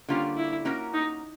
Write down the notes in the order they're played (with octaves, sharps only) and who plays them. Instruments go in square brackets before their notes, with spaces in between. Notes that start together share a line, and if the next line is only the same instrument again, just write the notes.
[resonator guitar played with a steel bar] D3 G3 A#3 C#4 [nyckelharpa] F4
[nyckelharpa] E4
[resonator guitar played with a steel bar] A#3 C#4 F#4 A#4
[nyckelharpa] D#4